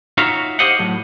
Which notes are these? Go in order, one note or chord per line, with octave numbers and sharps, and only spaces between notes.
D#4 F4 F#4 C#5 E5 F5
G4 C5 D#5 F5 F#5
A2 F#3